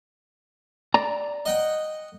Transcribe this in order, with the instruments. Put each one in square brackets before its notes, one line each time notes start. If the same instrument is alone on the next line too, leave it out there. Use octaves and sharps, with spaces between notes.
[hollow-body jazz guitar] D5 A#5
[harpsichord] D#5 F#5 G5